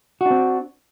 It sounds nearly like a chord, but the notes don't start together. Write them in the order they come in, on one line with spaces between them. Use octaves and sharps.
F#4 D4 C4